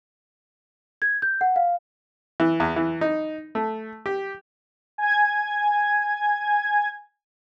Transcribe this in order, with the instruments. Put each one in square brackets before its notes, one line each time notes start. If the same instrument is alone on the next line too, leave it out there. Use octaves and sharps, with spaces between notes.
[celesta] G#6
G6
F#5
F5
[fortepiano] E3
E2
E3
D#4
A3
G4
[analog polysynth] G#5 G#6